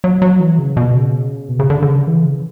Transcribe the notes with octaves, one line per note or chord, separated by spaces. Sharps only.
F#3
F#3
E3
C#3
B2
C#3
B2
C#3
D3
D3
C#3
E3
C#3